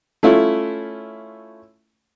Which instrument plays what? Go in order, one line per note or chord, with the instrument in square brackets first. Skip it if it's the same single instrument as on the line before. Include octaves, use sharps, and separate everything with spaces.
[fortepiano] A3 C#4 E4 F4